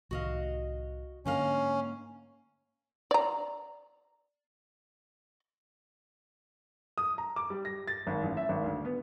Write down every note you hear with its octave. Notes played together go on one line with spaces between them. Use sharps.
C2 A2 D#3 F#4 D#5 F5
G#2 D3 A#3 C#4 F5
D5 A#5
D#6
A#5
D6
G3
A#6
A6
G#1
A1
E5
G#1
D2
B3